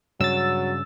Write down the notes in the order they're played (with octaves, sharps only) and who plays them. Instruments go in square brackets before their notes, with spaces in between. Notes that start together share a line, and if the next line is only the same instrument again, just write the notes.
[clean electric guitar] G2 C#3 C#4 [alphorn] F#3 [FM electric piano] E6 A6